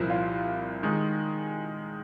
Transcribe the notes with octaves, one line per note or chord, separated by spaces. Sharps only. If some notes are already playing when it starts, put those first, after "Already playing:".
Already playing: C2 A#2 F3 A#3 E4
F4
D#3 G#3 D#4